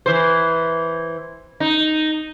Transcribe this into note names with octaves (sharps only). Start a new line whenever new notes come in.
E3 C5
D#4